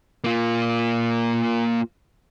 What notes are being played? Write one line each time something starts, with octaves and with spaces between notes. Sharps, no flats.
A#3 F4